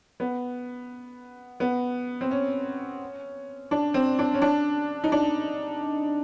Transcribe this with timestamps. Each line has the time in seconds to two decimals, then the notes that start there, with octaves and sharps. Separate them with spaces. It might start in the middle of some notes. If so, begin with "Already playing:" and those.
0.20 B3
1.60 B3
2.21 C4
2.31 C#4
3.71 D4
3.94 C4
4.19 D4
4.34 C#4
4.42 D4
5.04 D#4
5.12 D4